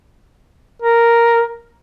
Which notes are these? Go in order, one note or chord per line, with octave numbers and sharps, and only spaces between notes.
A#4